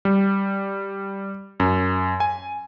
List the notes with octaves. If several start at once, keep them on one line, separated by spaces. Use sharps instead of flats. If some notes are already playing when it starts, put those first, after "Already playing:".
G3
F#2
G#5